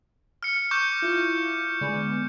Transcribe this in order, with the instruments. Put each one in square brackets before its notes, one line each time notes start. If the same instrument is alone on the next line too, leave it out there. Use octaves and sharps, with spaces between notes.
[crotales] F6 C#7
C#6 D6 G6
[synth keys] E4 F4
D3 G#3 B3